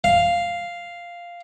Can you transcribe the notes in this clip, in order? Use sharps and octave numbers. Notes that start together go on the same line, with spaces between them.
F5